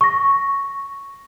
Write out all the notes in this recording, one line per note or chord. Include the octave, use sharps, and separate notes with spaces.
C#6 A#6